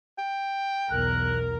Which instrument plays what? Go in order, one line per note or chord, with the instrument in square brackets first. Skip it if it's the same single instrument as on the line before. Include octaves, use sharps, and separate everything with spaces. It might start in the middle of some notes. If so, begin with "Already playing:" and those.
[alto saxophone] G5
[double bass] B1 E2 [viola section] A#4 [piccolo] F#6